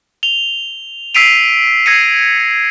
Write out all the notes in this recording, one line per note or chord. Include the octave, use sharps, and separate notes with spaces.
F7 G7
E6 B6 C7 D7 D#7 F7
E6 G#6 A#6 C7 C#7 D#7